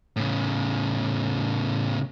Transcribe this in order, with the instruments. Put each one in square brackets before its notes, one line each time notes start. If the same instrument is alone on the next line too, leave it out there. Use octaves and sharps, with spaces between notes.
[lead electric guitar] A2 C#3